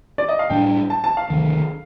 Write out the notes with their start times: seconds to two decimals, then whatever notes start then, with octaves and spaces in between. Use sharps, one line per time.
0.18 D5
0.29 D#5
0.39 F5
0.50 A2 G3 D4 G5
0.90 A5
1.04 A5
1.17 F5
1.30 D2 C3 D#3